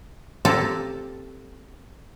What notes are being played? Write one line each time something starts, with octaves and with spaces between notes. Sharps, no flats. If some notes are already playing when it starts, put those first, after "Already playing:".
A#3 C4 F4 G4 A4 A5